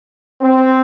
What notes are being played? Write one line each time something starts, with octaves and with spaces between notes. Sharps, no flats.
C4